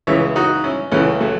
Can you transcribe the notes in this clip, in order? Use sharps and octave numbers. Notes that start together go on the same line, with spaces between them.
C#2 C#3 E3 C#5 E5
D#4 F#4
C#4 E4
C#2 C#3 E3 A3 C#4
F#3 A3